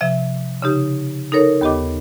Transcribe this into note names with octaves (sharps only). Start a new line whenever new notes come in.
C3 F3 E5
C#3 D#4 G4
D#4 A4 A#4 C#5
D#2 B3 G4 D#5 D6